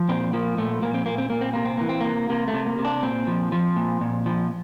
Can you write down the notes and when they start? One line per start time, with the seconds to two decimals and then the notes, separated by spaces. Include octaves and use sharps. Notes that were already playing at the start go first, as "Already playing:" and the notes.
Already playing: F3
0.08 A#2 C4
0.33 F3 A#3
0.58 A#2 A3
0.82 A#2 A#3
0.94 C4
1.06 A#2 A#3
1.18 C4
1.30 A#2 A#3
1.41 C4
1.53 C3 A#3
1.65 C4
1.77 E3 A#3
1.89 C4
2.01 C3 A#3
2.30 C3 A#3
2.48 A3
2.54 C3
2.66 A#3
2.79 C3
2.85 D4
3.03 A#2 C4
3.27 F3
3.52 F3
3.76 A#2
4.01 A#2
4.26 F3